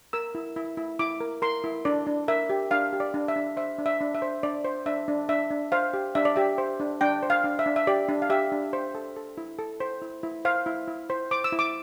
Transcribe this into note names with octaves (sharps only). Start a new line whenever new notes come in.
A#4 E6
E4
E4
E4
E4 D6
A#4
A#4 C6
E4
D4 D5
D4
A#4 E5
G4
D4 F5
G4
D5
D4
E5
D4
C5 E5
D4
E5
D4
E5
C5
D4 D5
C5
D4 E5
D4
D4 E5
D4
C5 F5
G4
D4 E5
D5
G4 E5
C5
D4
D4 G5
C5
F5
D4
E5
D4
E5
G4 D5
D4
F5
G4 E5
D4
C5
A4
A4
E4
A4
C5
E4
E4
C5 F5
E4
E4
C5
C5 D6
E6
E4
D6